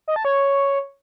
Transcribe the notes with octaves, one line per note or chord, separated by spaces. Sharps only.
D#5
A5
C#5